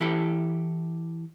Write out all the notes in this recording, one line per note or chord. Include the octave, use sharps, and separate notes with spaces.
E3 E4 G4 A4